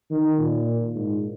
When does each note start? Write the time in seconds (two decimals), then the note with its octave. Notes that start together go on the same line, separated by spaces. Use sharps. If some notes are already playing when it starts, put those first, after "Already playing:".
0.11 D#3
0.39 A#2
0.95 G#2